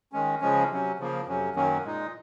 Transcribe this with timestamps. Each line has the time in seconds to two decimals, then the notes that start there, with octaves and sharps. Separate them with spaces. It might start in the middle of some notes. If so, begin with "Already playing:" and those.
0.12 D#3 G#3 C#4
0.41 C#3 F3 G#3 C#4
0.70 C3 F#3 C#4
0.99 C#3 F3 A#3
1.26 F2 C3 F#3 C#4
1.55 F#2 D#3 F#3 A#3 C#4
1.84 A#2 G#3 D#4